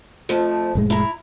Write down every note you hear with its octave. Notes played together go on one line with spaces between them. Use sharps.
F2 F3 A3
F1 A2 G#3
E4 A#5